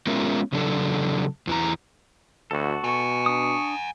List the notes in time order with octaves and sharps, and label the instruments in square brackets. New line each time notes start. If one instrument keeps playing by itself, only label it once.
[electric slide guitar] G#3 B3 C#4 F4 A#4 E5
E2 C#3 F#3 D4 A4
E2 E3 A#5
[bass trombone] D2 [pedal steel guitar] F#4 A4
[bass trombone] B2 [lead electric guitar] F#5 G#5 [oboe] C#6
[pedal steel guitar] D4 D#6